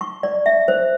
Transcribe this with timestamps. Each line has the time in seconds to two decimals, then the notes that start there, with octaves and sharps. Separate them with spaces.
0.01 C#6
0.23 D5
0.46 E5
0.68 C5